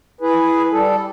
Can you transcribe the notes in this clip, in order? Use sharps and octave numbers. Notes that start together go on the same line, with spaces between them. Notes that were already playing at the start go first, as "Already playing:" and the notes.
E4 G#4 B4
G3 A4